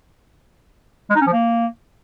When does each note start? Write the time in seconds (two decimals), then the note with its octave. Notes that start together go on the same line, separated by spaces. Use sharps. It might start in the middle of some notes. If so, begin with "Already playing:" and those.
1.10 G#3
1.15 D#4
1.21 C#4
1.27 F3
1.32 A#3